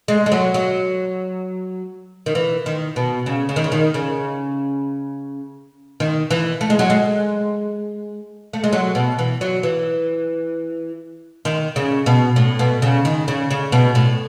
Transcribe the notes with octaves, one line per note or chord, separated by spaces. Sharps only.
G#3
G#3
F#3
F#3
D#3
E3
D#3
B2
C#3
C#3
D#3
C#3
D#3
C#3
D#3
E3
A3
G#3
F#3
G#3
A3
G#3
F#3
B2
E3
F#3
E3
D#3
C#3
B2
A2
B2
C#3
D#3
C#3
C#3
B2
A2